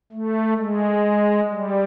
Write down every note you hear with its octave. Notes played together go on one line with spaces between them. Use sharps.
A3
G#3
G3